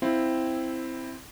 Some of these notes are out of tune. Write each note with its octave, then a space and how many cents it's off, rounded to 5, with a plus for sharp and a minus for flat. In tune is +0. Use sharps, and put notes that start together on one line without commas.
C4 +0 E4 +0 F5 +0